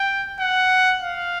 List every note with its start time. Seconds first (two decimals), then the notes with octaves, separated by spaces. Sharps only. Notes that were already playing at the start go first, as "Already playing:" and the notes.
Already playing: G5
0.40 F#5
1.02 F5